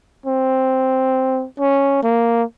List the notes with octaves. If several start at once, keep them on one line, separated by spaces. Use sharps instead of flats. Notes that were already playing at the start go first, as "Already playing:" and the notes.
C4
C#4
A#3